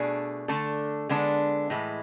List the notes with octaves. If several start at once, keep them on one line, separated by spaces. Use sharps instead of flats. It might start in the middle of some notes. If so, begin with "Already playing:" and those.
Already playing: B2 A3 D4 G#4
D3 A3 D4 A4
D3 G#3 B3 D4
A2 E3 G#3